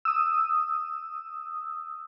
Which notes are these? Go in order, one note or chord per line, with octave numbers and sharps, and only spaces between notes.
D#6 E6